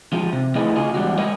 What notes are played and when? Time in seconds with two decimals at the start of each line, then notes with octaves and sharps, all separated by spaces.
0.13 F3 G#3
0.33 C3
0.55 F3 A3 E4 G#4 B4 D#5
0.76 C#3 F4 G#4 D#5
0.94 E2 G3 G#3 F#4
1.18 G#3 A#4 C#5 D#5